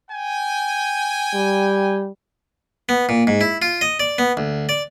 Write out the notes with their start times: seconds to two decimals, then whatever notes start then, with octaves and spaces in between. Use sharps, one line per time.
0.11 G5 G#5
1.35 G3
2.89 B3
3.09 A#2
3.27 G#2
3.41 E4
3.62 F4
3.81 D#5
4.00 D5
4.18 B3
4.37 D2
4.69 D5